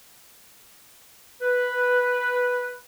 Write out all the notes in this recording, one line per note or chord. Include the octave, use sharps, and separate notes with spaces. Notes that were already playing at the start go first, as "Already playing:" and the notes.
B4